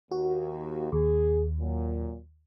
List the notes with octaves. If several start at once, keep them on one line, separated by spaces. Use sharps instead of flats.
D#2 F#4
D#2 G#4
A#2 F#3